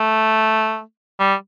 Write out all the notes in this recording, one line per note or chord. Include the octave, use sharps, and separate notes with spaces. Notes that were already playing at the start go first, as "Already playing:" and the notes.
Already playing: A3
G3